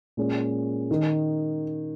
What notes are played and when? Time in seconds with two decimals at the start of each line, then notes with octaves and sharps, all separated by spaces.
0.17 A#2 G#3 C#4
0.91 D#3